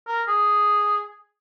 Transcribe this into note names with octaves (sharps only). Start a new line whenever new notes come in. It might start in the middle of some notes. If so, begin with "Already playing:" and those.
A#4
G#4